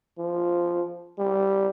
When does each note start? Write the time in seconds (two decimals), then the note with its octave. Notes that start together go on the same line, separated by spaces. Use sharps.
0.18 F3
1.19 G3